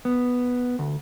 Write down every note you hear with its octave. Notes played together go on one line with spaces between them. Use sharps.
B3
D2